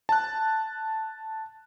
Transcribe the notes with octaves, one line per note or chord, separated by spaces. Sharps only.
A5 F#6